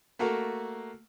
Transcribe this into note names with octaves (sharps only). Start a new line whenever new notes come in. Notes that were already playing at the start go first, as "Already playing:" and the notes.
A3 A#3 F#4 A4 A#4